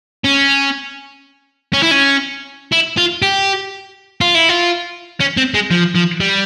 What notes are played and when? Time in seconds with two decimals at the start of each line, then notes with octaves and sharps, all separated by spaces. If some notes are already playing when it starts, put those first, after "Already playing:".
0.25 C#4
1.73 C#4
1.82 E4
1.91 C#4
2.72 E4
2.98 F4
3.22 G4
4.21 F4
4.35 E4
4.49 F4
5.20 C#4
5.37 C4
5.54 G#3
5.71 F3
5.95 F3
6.20 G3